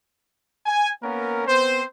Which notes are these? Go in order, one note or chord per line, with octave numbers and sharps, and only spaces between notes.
G#5
A#3 B3 C#4 A#4
B3 C4 C5